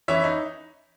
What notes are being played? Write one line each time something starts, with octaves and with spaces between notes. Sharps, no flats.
E3 C#5 E5
D#4